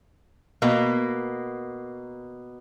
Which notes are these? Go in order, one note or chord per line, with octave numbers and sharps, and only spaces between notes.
B2 A#3